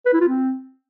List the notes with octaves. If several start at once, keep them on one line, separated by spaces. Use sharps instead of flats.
B4
E4
F4
C4